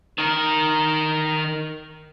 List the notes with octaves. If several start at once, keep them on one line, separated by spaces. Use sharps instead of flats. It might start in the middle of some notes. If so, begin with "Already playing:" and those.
D#3 A#4